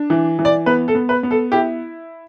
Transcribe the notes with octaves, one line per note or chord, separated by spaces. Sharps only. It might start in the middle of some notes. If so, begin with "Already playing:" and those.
Already playing: D4
E3
E3
D5
B3 B4
A4
B3
B4
B3
A4
E4 G4